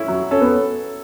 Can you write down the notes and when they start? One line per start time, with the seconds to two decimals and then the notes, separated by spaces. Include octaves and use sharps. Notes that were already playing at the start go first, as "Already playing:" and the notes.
Already playing: C#4 E4
0.08 F#3
0.31 C#4 A4
0.41 B3